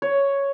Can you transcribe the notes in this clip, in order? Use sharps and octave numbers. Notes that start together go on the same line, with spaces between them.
C#5